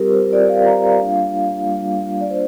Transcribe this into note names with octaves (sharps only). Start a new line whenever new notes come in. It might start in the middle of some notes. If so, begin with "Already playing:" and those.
Already playing: G3 C4 F4 G4 A#4
C5
G3 C4 F4 D5
F5
A#5
G3 A#3 D4 F4 F5
G3 A#3 D4 F4
D5
A#3 D4 F4 C5